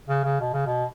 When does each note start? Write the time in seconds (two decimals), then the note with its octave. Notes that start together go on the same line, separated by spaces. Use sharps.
0.08 C#3
0.24 C#3
0.40 B2
0.54 C#3
0.66 B2